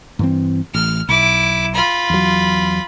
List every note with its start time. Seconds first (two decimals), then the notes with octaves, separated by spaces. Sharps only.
0.19 G2 E3 C4
0.75 A1 F6
1.09 B1 E4 D6
1.74 F4 B5
2.10 E2 F#3